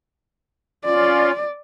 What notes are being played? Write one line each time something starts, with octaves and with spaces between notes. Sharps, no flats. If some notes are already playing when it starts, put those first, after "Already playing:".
C#4 F4 D5